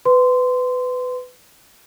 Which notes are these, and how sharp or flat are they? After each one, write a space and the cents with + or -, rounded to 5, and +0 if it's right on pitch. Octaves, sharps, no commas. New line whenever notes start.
B4 +20 C6 -15